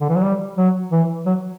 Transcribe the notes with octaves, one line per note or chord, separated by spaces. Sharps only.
D3
E3
F#3
G3
F#3
E3
F#3